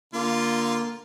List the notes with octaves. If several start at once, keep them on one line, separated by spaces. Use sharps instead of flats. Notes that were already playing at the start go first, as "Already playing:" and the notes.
D3 A#3 F4